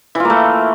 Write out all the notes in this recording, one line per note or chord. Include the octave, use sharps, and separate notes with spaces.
E3 A3 A#3 F4